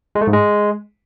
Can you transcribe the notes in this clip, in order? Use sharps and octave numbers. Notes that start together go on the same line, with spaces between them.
G#3
A3
G#2
G#3